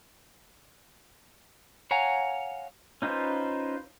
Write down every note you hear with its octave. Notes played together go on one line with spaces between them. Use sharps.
C#5 F5 F#5 G#5 A#5
C#4 D#4 F4 B4 C5